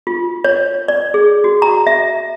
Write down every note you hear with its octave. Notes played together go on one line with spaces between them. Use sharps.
F4
C#5
D5
G#4
F#4
A#5
E5